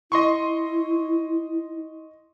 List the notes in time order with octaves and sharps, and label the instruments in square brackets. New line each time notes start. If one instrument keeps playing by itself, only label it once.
[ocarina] E4 [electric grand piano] D#5 C6 C#6